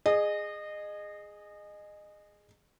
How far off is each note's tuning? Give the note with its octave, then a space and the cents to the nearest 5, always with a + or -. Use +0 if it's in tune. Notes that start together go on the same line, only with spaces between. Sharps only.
G#4 +0 D#5 -25